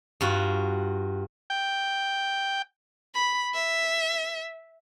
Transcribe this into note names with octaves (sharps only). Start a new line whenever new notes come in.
G2 F4 F#4
G5
B5
E5